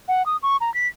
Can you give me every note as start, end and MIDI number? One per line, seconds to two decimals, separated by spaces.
0.08 0.25 78
0.26 0.37 87
0.43 0.57 85
0.60 0.73 82
0.74 0.87 95